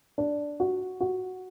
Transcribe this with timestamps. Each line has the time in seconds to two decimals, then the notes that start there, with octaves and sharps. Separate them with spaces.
0.18 D4
0.60 F#4
1.00 F#4